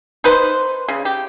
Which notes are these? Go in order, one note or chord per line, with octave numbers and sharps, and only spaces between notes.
D#4 B4 C5
C#3
G4